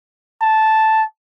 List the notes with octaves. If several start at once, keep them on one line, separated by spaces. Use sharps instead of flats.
A5